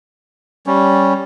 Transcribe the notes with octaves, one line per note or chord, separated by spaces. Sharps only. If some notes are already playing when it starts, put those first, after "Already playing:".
G3 C#4